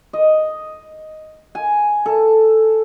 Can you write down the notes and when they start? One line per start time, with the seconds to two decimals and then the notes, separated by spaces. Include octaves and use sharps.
0.13 D#5
1.55 G#5
2.06 A4